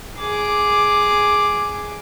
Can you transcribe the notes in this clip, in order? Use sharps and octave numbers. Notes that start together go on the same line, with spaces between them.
G#4 D6